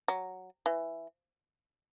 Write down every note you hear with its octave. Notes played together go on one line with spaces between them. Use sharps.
F#3
E3